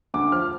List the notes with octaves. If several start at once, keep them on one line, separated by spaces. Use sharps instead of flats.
D2 D6
F3 F6